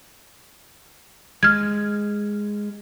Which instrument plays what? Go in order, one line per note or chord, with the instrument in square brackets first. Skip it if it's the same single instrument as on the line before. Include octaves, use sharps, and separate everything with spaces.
[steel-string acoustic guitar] G#3 [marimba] F6 G#6